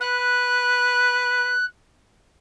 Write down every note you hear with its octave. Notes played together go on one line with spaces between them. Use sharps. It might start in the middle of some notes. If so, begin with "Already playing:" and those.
B4 F#6